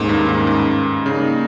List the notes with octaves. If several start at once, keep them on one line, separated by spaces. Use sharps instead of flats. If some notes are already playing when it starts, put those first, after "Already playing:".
Already playing: D#2 G#2 D#3 A#3 C#4
G2
G#2
G#2
C#3 G3 A#3 D#4